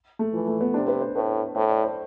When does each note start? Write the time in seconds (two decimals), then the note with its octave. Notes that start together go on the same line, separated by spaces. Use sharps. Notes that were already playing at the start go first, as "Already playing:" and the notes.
0.19 A3
0.33 E3 F3
0.47 A3
0.61 B3
0.74 C3 D4
0.88 B4
1.01 C5
1.15 A2 B4
1.55 A2 C5
1.69 D5
1.83 C5